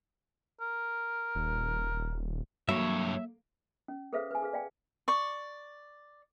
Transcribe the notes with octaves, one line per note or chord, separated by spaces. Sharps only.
A#4
D#1
G2 F#3 A#3 C#5 E5
C#4
G#4 A4 B4 C5 E5 F5
B4 G#5
G#4 B4 F5
D5 F5 G5 G#5
D5 C#6